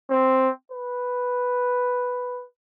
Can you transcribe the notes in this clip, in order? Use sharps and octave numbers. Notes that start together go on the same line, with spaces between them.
C4
B4